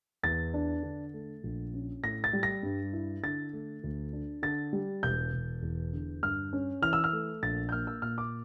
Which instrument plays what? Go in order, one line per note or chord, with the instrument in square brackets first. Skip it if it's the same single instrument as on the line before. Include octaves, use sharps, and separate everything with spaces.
[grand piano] E2 A6
D4
D3
A3
A#1
C#4
A2 A#6
A6
G3
A#6
G2
E4
D3 A6
A3
D2
D4
D3 A6
G3
E1 G6
E1
E2
D3
G2 F6
C#4
E3 F6
E6
F6
A3
A#1 A6
G6
A#3 F6
E6
A#2 F6
D6